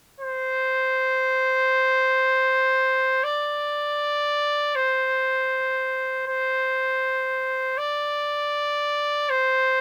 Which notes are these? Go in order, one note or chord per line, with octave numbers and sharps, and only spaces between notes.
C5
D5
C5
C5
D5
C5